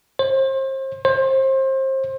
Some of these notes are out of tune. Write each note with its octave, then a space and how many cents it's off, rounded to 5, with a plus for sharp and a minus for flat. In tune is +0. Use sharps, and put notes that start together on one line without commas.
C5 +35
C5 +30